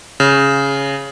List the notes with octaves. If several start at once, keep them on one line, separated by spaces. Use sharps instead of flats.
C#3